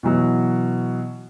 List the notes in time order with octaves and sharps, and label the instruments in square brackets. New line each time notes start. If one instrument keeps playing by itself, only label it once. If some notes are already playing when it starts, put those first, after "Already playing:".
[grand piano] B2 E3 F#3